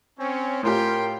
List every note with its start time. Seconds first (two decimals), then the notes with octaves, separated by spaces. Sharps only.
0.18 C4 C#4
0.63 A2 F4 G4 A#4 G5 C6